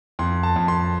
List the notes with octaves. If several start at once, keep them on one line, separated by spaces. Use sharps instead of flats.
F2 C6
A5
F2
C6